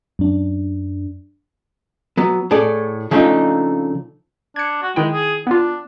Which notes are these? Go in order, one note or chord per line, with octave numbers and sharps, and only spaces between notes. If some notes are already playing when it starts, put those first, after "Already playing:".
F#2 D4
F#3 B3
A2 G#4 A4 D5
C#3 F3 A3 C4 D4 D#4
D4 G#6 C#7
F#4
D#3 G#3 E4 G5
G#4
B3 D4 F4